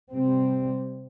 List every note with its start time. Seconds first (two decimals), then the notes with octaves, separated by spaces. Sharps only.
0.13 C3 G3 C4